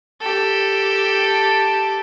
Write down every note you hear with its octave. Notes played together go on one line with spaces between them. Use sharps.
G4 A4